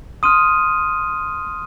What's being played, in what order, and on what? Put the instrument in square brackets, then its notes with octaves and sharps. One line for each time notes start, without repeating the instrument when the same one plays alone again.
[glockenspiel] C6 D#6 F6 D#7